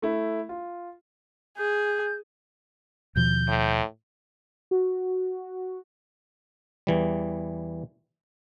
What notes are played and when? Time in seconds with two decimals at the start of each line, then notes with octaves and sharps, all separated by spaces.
0.02 A3 E4
0.49 F4
1.58 G#4 G6
3.16 D#2 B2 F3 G6
3.48 A2
4.71 F#4
6.87 E2 E3 G3